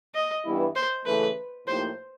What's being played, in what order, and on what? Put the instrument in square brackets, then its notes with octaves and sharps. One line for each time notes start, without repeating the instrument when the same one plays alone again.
[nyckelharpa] D#5
[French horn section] G2 E3 G3 B3 E4
[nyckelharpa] C5
[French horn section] C#3 E3 A3 [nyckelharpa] B4
[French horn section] A2 F3 A#3 D#4 G4 [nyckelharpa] C5